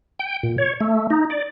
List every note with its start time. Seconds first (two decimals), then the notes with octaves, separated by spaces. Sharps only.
0.19 G5
0.43 A#2
0.58 C#5
0.81 A3
1.10 D#4
1.30 D5